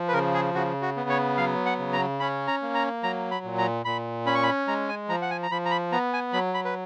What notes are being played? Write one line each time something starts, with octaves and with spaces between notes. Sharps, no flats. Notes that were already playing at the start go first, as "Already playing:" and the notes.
Already playing: F3
B4
C#3 A#4
G#4
C#3 F#4
F#4
B3
C#5
F#3 F5
F#5
C#3
A#5
C#4 B5
A#5
A#3
A#5
F#3 A#5
B5
A#2
A#5
A#2 B5
C#4 B5
C#6
B5
G#3 A#5
G#5
F3 A#5
F#5
G#5
A#5
F3 B5
A#5
B5
B3 A#5
G#5
F#3 B5
B5
B4